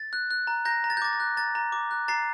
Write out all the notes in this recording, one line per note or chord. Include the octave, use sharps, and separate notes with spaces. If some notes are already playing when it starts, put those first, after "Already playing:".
Already playing: A6
F#6
F#6
A#5
A#5 G6 A#6
A#5
A6
G6
D6 A6
A6
F#6
A#5 A6
A#5
D6
F#6
A#5 A6 C7